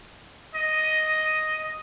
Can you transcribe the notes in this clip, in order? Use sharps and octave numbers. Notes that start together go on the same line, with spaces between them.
D#5